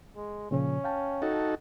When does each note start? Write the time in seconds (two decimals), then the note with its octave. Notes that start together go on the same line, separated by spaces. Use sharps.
0.16 G#3
0.51 A#2 C#3 F3 C#4
0.84 F5 G5 A5
1.22 D#4 F#4 A4